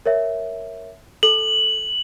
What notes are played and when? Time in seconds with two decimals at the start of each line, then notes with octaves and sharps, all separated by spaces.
0.06 A#4 C#5 E5
1.23 A4 F#7